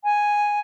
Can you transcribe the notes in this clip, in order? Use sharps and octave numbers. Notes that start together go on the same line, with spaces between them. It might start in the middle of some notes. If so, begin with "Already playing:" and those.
G#5